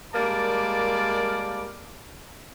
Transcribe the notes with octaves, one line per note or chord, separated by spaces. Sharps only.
G3 G#3 A#3 A#4 D5 A5